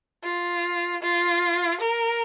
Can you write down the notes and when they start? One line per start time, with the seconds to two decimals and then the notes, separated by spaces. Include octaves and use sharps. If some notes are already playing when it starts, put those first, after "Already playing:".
0.24 F4
1.03 F4
1.81 A#4